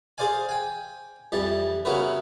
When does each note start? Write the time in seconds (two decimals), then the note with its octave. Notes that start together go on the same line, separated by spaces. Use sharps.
0.18 G#4 C5 D5 F5 G#5
0.49 G5 G#5
1.32 F2 E3 G3 A5
1.85 C#3 B3 E4 F#4 A#4 B4